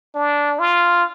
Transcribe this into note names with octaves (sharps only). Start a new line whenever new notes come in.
D4
F4